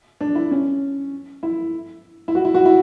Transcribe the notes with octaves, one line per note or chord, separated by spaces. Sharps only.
D4
E4
C#4
E4
E4
F#4
E4
F#4
E4